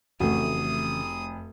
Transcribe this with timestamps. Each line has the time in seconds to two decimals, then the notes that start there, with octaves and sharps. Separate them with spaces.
0.20 F1 C#3 E3 A3 C#4 F#4 D#6